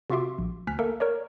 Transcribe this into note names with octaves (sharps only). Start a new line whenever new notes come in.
C3 F4 F#4 E5 C6 D6
A#1
D2 G#5 F6 F#6 B6
A#3 A4 A#4 E5
A#4 C#5 D5